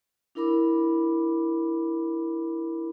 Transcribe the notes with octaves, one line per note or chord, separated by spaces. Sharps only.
D4 E4 A#4 B5 D6